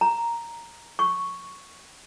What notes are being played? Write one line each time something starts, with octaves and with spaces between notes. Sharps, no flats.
A#5
C#6